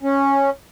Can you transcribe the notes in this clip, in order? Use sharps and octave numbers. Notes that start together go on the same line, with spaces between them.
C#4